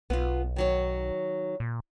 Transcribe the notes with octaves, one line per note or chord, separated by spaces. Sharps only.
B1 B3 F4
D#3 F#3 C#5
A#2